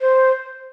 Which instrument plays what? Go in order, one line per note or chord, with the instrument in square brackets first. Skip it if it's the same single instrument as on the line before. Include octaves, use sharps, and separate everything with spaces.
[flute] C5